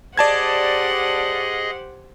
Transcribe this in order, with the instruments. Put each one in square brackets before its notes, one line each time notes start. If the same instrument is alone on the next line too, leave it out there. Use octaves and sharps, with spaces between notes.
[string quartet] G4 C5 F#5 [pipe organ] G#4 D#5 [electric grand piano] D5 A5 G#6